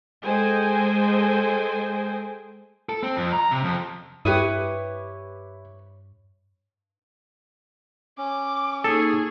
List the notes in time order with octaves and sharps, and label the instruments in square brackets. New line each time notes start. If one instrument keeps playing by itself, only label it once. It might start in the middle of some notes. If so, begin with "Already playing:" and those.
[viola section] G#3 A4 C5 D#5 G5 G#5
[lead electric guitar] A4
C4
F2
A#5
C3
F2
[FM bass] G2 [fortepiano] E4 G4 [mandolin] B4 C#5 D#6
[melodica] C#4 [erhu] D6
[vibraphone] A#3 D#4 C#6 [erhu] G#4 [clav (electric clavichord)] A4